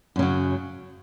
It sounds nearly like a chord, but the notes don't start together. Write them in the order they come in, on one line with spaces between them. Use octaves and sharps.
F#2 C#3 F#3